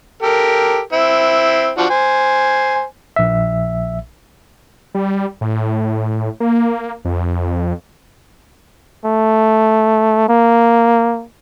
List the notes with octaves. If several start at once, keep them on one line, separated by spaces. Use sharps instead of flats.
G4 A4 A#4
C4 E4
F3 D4 F#4
C5 G#5
A#1 E5
G3
A2
A#3
F2
A3
A#3